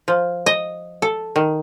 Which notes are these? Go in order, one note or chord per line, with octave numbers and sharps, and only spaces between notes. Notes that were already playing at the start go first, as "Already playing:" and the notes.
F3
D#5
A4
D#3